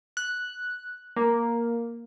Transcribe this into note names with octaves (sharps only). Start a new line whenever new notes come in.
F#6
A#3